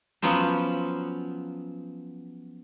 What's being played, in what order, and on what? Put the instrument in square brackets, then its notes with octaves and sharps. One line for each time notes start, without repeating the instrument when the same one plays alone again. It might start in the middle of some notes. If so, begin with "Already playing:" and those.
[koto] F3 F#3 B3 C#4 C5